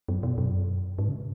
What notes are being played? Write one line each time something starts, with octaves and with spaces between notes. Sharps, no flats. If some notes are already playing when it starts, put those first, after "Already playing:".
F#2
B2
F#2
G#2
C#3